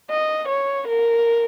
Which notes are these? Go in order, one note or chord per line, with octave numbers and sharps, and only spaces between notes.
D#5
C#5
A#4